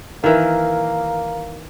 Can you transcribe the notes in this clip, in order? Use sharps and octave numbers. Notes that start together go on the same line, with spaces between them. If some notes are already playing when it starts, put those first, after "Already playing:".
D#3 E3 A#3